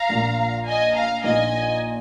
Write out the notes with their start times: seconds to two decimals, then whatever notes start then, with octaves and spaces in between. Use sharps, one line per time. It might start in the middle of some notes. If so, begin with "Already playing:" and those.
Already playing: F5 A#5
0.09 A#1 A#2 A#3
0.66 D#5 G#5
0.95 F5 A#5
1.23 A#1 A#2 A#3 D#4 D#5 G#5